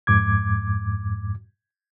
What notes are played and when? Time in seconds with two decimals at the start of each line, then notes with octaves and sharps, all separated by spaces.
0.07 F2 G#2 D6 G#6